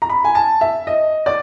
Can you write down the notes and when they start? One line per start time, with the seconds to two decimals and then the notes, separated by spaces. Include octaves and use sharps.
0.02 A#5
0.09 B5
0.24 G#5
0.35 A5
0.61 E5
0.87 D#5
1.26 D5